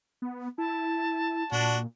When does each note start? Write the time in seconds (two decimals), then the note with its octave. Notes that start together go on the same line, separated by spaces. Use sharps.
0.22 B3
0.58 E4 A5
1.52 A#2 D4 F#4